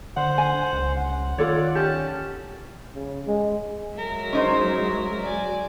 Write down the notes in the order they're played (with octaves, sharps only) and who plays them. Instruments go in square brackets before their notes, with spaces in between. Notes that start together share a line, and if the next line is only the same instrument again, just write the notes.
[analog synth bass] D3 [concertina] C5 [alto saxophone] F#5
[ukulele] G#5
[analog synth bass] C#2
[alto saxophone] F#5
[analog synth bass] D#3 [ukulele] F4 A4 C#5 [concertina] D5
[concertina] C#4 A5 [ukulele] G4
[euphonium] C#3
G#3
[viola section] F#3 G#3 [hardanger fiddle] A#4 E5
[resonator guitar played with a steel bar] C#4 D#4 C5
[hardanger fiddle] D5 G#5